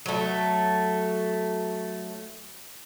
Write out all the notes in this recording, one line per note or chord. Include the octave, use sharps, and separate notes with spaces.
F#3 A3